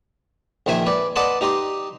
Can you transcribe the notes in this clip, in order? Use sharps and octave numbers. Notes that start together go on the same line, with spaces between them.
A#1 D#3 C5 E5 G#5
B4 D5
B4 D5 D#5 F#5 A5 C6
D#4 G4 D#5 C6